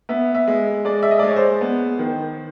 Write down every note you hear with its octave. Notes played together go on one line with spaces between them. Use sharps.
B3 E5
E5
G#3
G#3 D5
E5
D#5
D5
G#3
C#5
C5
B3
D#3